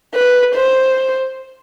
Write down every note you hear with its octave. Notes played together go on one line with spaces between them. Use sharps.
B4
C5